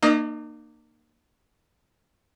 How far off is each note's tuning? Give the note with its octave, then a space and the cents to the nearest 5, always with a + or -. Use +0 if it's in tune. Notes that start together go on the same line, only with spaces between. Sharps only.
A#3 +0 D#4 -40 D#5 +25